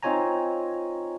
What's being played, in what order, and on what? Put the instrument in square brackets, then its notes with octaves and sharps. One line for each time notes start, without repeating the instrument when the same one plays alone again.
[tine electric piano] C4 D#4 F4 C#5 G#5 A#5